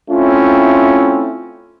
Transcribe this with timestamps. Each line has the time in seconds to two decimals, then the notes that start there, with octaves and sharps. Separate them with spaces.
0.11 A3 C4 C#4 E4 F4